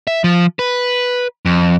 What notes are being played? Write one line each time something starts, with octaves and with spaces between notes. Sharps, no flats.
E5
F3
B4
F2